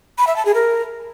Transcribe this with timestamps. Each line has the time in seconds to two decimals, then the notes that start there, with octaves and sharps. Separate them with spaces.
0.18 B5
0.27 E5
0.36 A5
0.45 G#4
0.54 A#4